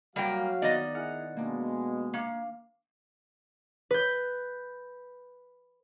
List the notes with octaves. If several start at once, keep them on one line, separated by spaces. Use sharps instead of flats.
F#3 G3 A#3 F#4 F5 G5
D#3 B3 D5 D#5
E4 G#4 F#5 F6
B2 G#3 A#3 D4
A#3 F5
B4 G6